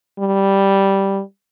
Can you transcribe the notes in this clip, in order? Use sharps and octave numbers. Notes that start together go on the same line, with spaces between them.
G3